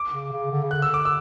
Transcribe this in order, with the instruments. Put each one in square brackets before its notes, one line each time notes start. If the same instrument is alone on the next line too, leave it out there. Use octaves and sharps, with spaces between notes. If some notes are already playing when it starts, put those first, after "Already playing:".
Already playing: [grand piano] D6
[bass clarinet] C#3
C#3
D3
C#3
[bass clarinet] D3 [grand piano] F#6
[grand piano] E6
D6
E6